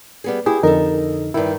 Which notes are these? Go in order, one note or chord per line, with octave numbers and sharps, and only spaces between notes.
G3 B3 G#4
E4 G4 G#4
F2 D3 D#4 A4 A#4
G2 D#3 E4